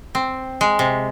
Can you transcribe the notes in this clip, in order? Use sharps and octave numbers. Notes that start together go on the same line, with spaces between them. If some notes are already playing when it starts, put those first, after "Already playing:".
C4
G#3
C3